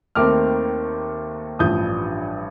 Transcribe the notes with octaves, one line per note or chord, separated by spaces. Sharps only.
D#2 D#3 A3 C4 D6 F6
A1 G2 F3 D#6 G6